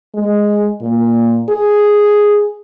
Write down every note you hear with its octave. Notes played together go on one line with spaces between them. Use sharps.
G#3
A#2
G#4